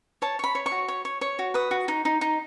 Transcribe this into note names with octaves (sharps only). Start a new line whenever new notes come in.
C#5 A5
C#5 B5
C#5
C#6
F#4
C#5
C#5
C#5
F#4
B4 D#6
F#4
D#4
D#4
D#4